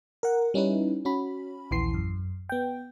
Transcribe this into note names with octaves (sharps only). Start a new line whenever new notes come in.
A#4 F#5
G3 C#4 D#4 E4 B4
C#4 F#4 B5
A#1 D#2 E3 C6 C7
F#2
B3 G5